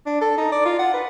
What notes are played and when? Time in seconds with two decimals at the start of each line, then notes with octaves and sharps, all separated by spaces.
0.06 D4
0.21 A4
0.38 D#4
0.52 D5
0.65 F4
0.79 F#5
0.94 B4